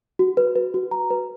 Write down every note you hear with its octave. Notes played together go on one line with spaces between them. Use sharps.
F#4
B4
B4
F#4
A#5
B4